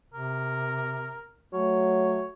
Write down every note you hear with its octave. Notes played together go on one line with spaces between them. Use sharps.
C3 A#4
F#3 A3 C#5